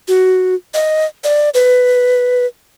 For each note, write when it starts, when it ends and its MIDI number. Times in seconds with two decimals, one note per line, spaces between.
0.08 0.54 66
0.74 1.04 75
1.24 1.50 74
1.54 2.46 71